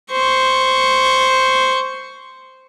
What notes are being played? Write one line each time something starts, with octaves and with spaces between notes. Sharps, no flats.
C5 C#6